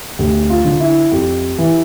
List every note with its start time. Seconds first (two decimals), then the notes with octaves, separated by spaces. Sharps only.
0.19 D2 G4
0.50 F4
0.65 D3
0.80 E4
1.11 F2 G4
1.58 E3